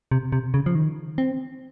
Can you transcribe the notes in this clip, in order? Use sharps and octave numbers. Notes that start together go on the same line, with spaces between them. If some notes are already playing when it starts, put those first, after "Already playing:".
C3
C3
C#3
F3
D#3
C4